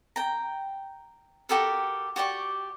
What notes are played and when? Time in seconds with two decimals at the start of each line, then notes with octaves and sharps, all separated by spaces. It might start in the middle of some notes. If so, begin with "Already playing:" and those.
0.16 G5 A#5
1.49 F#4 G4 A4 A#4
2.16 F#4 G4 D5 C#6